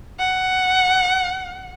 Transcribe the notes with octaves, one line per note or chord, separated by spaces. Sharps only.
F#5